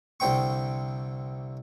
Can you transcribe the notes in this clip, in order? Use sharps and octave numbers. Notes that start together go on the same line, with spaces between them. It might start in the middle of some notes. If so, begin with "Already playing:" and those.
C2 D3 C5 G5 C#6